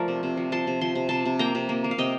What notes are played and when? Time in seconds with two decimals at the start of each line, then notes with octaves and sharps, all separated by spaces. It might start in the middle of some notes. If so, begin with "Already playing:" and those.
Already playing: F3 A3 A#4 D5
0.08 C3
0.23 C3
0.37 F3
0.52 F3 A5 C6
0.67 C3
0.81 F3 C6
0.95 C3
1.09 C3 A5 C6
1.25 C3
1.39 A#3 G5 A#5
1.55 C3
1.69 A#3
1.84 A#3
1.91 F5
1.98 C3 D#5 G5